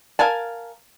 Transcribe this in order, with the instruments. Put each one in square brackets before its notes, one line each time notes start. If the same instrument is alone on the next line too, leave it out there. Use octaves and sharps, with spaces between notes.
[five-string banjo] A#4 F5 G#5 A5